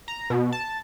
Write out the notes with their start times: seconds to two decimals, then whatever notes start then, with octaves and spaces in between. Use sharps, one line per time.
0.08 A#5
0.30 B2
0.52 A5